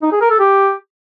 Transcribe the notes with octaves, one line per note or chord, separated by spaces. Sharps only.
D#4
G#4
A#4
A4
G4